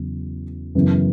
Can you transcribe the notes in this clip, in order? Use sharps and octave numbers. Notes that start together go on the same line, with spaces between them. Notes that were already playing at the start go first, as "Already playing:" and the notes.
Already playing: E2 C#3 F#3
F#2 C#3 E3 B3